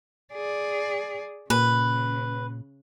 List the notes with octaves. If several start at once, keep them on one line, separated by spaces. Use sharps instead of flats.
G#4 D5
A#2 C#3 B4